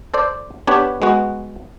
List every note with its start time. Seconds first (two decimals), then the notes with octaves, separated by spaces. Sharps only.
0.14 A4 C5 D5
0.67 B3 D4 G4 B4 C#5
1.02 G#3 B3 F#4